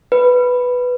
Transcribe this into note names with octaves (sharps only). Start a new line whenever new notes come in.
B4